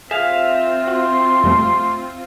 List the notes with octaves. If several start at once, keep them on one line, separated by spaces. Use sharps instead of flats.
C4 F4 G#4 E5 F5
F#4 C6
F2 G3 A3